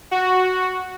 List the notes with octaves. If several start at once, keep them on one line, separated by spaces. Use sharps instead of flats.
F#4